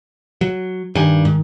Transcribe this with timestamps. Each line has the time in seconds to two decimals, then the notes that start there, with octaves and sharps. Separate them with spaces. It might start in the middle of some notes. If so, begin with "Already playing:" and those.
0.41 F#3
0.95 G2 D#3 G#5
1.25 G#2